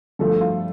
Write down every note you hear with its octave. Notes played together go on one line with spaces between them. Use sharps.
G2 F3 A3 A4
F4